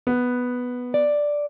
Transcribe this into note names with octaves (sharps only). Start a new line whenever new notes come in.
B3
D5